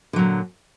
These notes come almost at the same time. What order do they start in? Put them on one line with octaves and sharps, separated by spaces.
D3 F#3 A#2